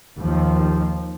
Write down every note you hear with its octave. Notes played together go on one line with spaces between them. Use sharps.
D#2 F3